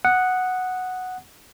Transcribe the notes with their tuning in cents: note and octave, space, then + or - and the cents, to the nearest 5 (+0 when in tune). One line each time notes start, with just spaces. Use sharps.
F#5 +0 D#6 +0